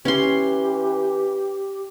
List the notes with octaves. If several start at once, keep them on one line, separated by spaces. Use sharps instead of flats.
E3 C#4 G4 C6